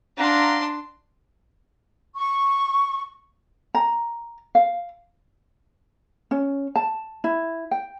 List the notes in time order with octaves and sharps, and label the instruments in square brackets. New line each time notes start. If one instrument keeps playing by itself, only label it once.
[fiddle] D4 C6 [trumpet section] F5 F#5 A#5
[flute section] C#6
[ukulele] A#5
F5
C#4
A5
E4
G5